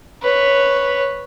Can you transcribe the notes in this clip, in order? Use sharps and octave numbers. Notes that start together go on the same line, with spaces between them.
B4 C#5